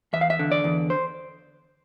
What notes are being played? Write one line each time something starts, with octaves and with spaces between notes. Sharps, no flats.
E2 E5
F5
E5
D3
D5
E2
C5